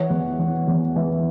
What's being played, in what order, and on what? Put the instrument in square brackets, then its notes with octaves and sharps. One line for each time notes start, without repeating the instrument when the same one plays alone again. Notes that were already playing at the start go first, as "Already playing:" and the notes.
Already playing: [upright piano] E3 C#5 F#5
E2
E3
E2
E3